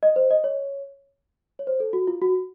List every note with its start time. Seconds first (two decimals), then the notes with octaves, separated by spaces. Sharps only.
0.03 D#5
0.16 C5
0.31 D#5
0.44 C#5
1.59 C#5
1.67 C5
1.80 A4
1.93 F#4
2.07 F4
2.22 F#4